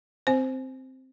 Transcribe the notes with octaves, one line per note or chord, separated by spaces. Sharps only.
C4 C5